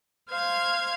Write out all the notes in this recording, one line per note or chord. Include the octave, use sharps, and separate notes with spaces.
C5 F5 F6 G#6